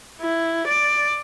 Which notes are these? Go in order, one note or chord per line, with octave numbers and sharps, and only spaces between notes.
E4
D5